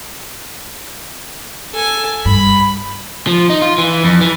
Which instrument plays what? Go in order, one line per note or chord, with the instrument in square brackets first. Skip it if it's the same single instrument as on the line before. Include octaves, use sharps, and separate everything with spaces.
[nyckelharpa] A4 G#5
[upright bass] G2 [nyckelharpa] B5
[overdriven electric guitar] F3
D#4
F4
E3
F2
E3